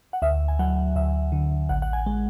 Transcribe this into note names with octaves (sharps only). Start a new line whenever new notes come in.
F#5
D2 E5
G#5
F#3 F#5
D2 E5
D3
A1 F#5
F#5
G#5
G#3